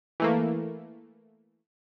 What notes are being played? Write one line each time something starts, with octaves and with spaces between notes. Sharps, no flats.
E3 A3 A#3